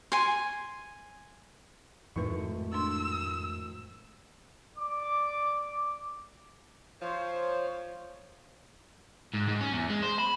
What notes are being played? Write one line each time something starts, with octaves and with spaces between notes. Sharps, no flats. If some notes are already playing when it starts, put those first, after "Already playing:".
G#5 C6
G#1 F2 A2 F3 A3 D#4 B4 C#6
D4 C6 E6
D5 D6
F3 C5 C#5
G#2
G#2
C#4
E2
G#3
C5
B5